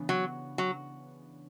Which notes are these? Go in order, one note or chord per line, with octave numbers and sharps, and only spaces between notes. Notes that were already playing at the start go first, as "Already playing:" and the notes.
Already playing: C#3 E3 B3 D4
F#3
F#3